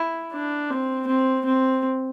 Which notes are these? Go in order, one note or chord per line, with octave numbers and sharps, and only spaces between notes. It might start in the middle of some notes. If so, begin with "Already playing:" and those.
Already playing: E4
D4
C4
C4
C4